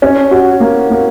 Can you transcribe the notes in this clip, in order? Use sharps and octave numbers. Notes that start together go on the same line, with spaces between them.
C#4
F#4
A#3
A#3